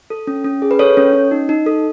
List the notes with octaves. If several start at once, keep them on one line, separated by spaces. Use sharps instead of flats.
A4
C#4
C#4
G#4
B4
A4 C#5
C#4
C#4
D#4
D#4
A4